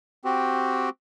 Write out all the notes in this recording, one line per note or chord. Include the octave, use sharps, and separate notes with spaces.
C4 F#4 G4